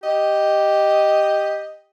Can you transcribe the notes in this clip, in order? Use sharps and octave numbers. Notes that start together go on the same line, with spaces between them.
G4 D#5